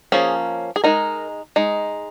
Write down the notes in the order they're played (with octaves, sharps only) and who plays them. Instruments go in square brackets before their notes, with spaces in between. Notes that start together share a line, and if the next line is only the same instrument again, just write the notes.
[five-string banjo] F3 A#3 C#4 G#4
G#4
G#3 D#4 A#4
G#3 D#4